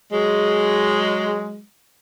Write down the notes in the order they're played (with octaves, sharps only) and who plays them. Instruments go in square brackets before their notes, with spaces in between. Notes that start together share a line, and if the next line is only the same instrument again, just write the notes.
[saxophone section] F#3 G#3